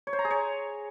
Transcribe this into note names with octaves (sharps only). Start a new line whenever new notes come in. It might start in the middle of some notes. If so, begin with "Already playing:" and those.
C#5
C5
A#5
G#4
C#5